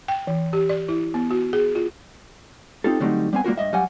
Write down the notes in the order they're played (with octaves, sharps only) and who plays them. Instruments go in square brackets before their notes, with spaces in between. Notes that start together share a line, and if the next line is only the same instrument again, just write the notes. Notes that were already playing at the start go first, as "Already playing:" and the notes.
[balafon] G5
E3
G4
D5
E4
B3
F#4
G#4
F4
[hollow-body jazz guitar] C4 D#4 F4 G4 A4
D3 F#3 G3 A3 C4 D#4
G3 B3 C4 G#5
G3 A#3 F4 F#4 A#4
G2 D#5 E5
F#3 G3 F5 F#5 G#5